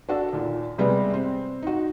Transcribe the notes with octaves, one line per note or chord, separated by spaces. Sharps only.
D4 F#4 A4
D#2 A#2
C3 G3 G#3 B3
C4
D#4 F#4